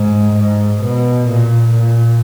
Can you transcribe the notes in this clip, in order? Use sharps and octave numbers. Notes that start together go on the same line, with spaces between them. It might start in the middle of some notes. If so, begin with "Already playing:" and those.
Already playing: G#2
G#2
B2
A#2
A#2